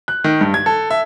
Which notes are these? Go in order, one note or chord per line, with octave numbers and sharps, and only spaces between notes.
F#6
D#3
G2
G#6
A4
E5